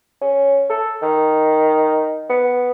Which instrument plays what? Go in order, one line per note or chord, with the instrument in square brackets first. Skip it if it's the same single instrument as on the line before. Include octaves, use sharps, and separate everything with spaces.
[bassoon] C#4
A4
D#3
B3